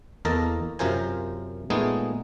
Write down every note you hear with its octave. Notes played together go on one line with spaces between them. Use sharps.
E2 A#3 A4 A#4 D#5 A5
F#2 C3 F4 A#4 C5 G#5
A#2 G#3 A3 B3 D#4 G#4